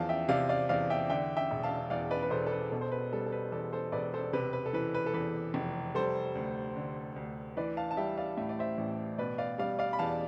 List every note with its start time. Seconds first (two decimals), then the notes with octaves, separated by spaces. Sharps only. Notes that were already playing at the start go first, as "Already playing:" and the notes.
Already playing: E2 F3 F5 A5
0.09 E5 G5
0.29 C3 D5 F5
0.49 D5 F5
0.69 E2 D5 F5
0.90 E5 G5
1.10 D3 E5 G5
1.37 E5 G5
1.51 E1
1.63 F5 A5
1.90 E2 D5 F5
2.10 B4 D5
2.22 B4
2.31 E1 A4 C5
2.46 A4
2.52 B4
2.71 B2 A4
2.81 C5
2.92 B4
3.12 G3 A4
3.26 A4
3.32 B4
3.52 E2 A4
3.73 A4 C5
3.92 E1 B4 D5
4.14 A4 C5
4.33 C3 B4
4.53 B4
4.66 A4
4.73 E3 B4
4.94 B4
5.06 A4
5.14 E2 B4
5.54 F1
5.95 G3 A4 C5
6.35 D2
6.76 D3
7.16 D2
7.57 E3 B4 D5
7.77 F5 A5
7.91 A5
7.97 G3 E5 G5
8.17 D5 F5
8.37 A2 E5
8.49 D5
8.59 C5 E5
8.78 A1
9.18 B2 B4 D5
9.38 D5 F5
9.58 G3 D5 F5
9.79 D5 F5
9.93 B5
9.99 E2 F5 A5